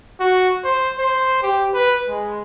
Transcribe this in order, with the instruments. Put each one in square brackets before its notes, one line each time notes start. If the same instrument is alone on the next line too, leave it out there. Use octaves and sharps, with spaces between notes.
[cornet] F#4
C5
C5
G4
B4
G#3